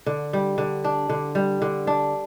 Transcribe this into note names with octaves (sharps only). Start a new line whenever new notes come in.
D3
G3
D3
D4
D3
G3
D3
D4